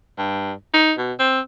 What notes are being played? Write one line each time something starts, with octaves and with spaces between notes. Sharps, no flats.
G2
D#4
B2
C4